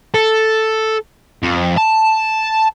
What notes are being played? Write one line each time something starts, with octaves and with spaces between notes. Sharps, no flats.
A4
F2
A5